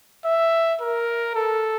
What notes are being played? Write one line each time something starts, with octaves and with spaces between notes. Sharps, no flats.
E5
A#4
A4